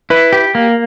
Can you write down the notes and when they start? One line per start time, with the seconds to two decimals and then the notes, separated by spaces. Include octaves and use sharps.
0.10 E4 B4
0.33 G4
0.55 A#3